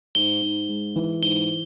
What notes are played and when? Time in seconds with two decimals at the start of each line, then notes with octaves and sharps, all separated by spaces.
0.15 G#2 G7
0.42 G#2
0.69 G#3
0.96 E3
1.22 G#2 G7